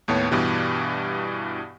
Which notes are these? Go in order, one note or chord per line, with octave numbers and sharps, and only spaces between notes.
D#2 A2 B3 C#5 A5
G2 B2 E3 G4